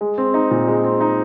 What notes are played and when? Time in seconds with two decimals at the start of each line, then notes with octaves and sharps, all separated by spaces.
0.01 G#3
0.18 C4
0.34 D#4
0.51 A#2
0.68 G#3
0.84 C4
1.01 D#4